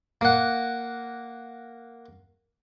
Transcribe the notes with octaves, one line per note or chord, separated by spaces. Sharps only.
A#3 F#5